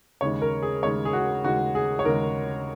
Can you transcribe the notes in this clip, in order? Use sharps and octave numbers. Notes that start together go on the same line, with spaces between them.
D#2 C#3 G#3 C#5
A#4
G#4
D#2 C#3 G#3 C#5
G#4
F#4
D#2 C#3 G#3 F#4
G#4
C#5
D#2 C#3 G#3 A#4